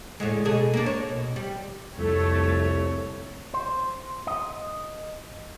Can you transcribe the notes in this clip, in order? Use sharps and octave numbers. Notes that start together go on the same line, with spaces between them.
A2 D3 G#3
B2 G#4 A4
A#3 D4
C#5
B2
G3
C2 F2 A3 C#5
C5
D#5